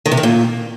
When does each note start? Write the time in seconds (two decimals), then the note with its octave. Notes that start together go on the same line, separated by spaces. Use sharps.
0.06 D#3
0.11 C3
0.17 D#3
0.23 A#2